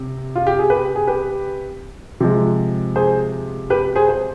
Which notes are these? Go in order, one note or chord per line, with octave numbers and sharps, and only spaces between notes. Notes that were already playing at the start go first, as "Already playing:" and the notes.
Already playing: C3
F4
G4
G#4
G4 B4
G#4
G4 B4
C3 F3 G#3
G#4 C5
G4 B4
G#4 C5
C5